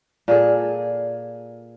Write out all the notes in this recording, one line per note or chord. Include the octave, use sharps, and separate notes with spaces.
A#2 G#4 A4